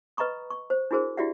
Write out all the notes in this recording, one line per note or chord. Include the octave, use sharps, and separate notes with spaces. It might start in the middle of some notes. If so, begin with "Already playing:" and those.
B4 D#5 A#5 B5 C#6 D#6
C#6
C5
D4 E4 F#4 G#4 A#4 C5
E4 F#4 G4 D5 E5 F#5